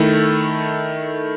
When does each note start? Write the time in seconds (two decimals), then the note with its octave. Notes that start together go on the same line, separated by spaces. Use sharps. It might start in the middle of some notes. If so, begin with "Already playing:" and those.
Already playing: D#3 A3 E4 A4